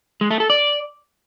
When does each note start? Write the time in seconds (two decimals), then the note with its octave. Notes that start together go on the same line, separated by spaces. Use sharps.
0.21 G#3
0.31 A3
0.40 A4
0.50 D5